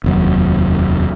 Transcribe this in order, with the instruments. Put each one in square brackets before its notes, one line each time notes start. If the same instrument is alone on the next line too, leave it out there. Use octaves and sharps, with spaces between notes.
[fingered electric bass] F1 D#2 F#3